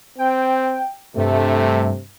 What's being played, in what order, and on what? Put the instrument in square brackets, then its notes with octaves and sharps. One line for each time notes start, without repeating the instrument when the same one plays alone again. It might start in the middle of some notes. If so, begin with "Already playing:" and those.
[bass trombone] C4 [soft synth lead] G5
[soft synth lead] G2 [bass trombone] C3 [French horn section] A3